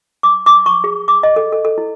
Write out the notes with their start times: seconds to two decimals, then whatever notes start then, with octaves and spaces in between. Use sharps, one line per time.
0.23 D6
0.46 D6
0.66 C#6
0.84 G#4
1.08 D6
1.23 D#5
1.36 A4
1.52 A4
1.65 A4
1.78 E4